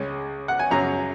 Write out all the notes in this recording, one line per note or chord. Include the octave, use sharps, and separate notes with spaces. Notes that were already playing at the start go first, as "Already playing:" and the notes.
Already playing: C#2 C#3 G#3 C#4
F#5
G#5
F#2 C#3 F#3 C#4 A#5